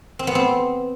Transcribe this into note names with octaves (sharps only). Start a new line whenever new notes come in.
C4
B3
C4